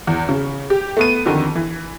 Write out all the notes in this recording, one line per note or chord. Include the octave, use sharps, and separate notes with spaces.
E2
C#3
G4
A3 B3 D#7
F2 D3 D#3
E3